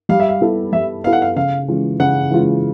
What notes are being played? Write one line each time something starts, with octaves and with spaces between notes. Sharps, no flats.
G3 F5
E5
F5
B3 E4 A4
G3 E5
B3 E4 A4 F5
F#5
F5
C#3 F5
E3 G#3 C#4 F4
C#3 F#5
E3 G#3 C#4 F4